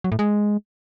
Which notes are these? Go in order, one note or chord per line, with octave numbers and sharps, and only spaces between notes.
F#3
A2
G#3